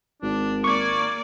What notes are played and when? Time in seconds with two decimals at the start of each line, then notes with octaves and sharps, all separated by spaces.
0.22 G#1 D4
0.64 A#3 D5 C#6 D6 G#6